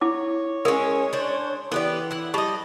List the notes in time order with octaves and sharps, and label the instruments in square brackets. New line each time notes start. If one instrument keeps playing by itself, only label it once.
[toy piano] E4 D6 [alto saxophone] C#5
[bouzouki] G#3 C#4 [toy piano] A#4
[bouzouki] D4 C5
[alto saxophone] E3 [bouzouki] B3 G4 D5 [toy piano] A4
[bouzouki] E4 F#5
[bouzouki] G3 D#5 [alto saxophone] A5 [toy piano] C#6